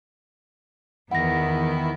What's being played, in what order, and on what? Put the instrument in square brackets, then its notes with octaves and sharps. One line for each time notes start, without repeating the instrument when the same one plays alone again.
[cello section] E2 B3 [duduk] D#3 [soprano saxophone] E4 [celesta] F#5 A#6